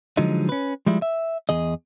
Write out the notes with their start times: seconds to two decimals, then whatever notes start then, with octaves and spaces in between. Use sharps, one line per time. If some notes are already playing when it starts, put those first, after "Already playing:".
0.17 D3 F3 F#3 G#3 D#4
0.49 C#4 B4
0.86 F3 G3 G#3 E4
1.02 E5
1.49 E2 G#4 D#5